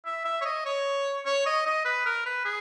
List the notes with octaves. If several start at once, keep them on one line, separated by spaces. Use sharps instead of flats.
E5
E5
C#5
D#5
C#5
C#5
D#5
D#5
B4
A#4
B4
G#4